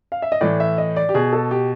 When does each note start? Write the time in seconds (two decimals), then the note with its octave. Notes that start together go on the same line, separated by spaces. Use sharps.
0.12 F5
0.22 E5
0.32 D#5
0.41 A2 E3 D5
0.60 E5
0.78 D#5
0.96 D5
1.09 G4
1.14 B2 G#4
1.33 A4
1.51 G4